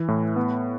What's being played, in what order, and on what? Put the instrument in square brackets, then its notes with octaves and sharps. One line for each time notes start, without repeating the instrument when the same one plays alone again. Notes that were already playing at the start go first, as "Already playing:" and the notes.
Already playing: [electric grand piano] E3
A2
B3